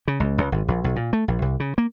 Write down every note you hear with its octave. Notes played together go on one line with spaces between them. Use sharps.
C#3
C#2
C#2
G#1
A#1
B1
A#2
A3
A#1
C2
C#3
A#3